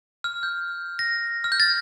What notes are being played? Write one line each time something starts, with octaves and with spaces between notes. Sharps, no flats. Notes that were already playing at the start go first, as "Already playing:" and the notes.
F6
G6
A#6
F6
G6
A6